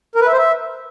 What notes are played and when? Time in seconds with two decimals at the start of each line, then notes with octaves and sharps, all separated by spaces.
0.15 A#4
0.21 B4
0.27 E5
0.32 C5
0.38 E5